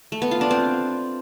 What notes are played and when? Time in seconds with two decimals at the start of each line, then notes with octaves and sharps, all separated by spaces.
0.12 A3
0.22 B3
0.31 F4
0.41 D4
0.51 C4